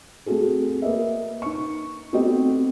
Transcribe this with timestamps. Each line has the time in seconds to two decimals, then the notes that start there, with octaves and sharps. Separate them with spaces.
0.26 A3 C4 F#4 G#4 A4
0.82 A#3 B4 D#5 E5
1.42 D#4 C#6
2.13 A3 B3 C4 F#4 G4 D#5